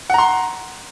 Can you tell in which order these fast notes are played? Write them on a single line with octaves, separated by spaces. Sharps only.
F#5 A#5 C6